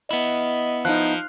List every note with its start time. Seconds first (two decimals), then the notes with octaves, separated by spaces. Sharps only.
0.11 B3 E4 D#5
0.85 F3 D#4 F#6